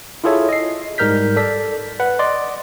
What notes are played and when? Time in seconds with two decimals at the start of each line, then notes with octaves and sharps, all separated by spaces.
0.24 E4 F4 G#4 A4 C#5 E5
0.49 D#5 C7
0.98 G#2 G3 A#4 F6 G6 B6
1.36 A4 D5 B6
2.00 B4 F#5
2.19 D5 D#5 C6